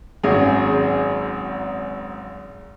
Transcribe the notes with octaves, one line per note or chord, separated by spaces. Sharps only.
G#1 F#2 G#4